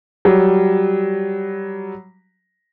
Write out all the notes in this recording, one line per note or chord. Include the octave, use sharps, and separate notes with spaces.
F#3 G3